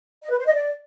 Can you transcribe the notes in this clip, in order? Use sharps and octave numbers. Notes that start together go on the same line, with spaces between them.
D#5
B4
C5
D#5
D5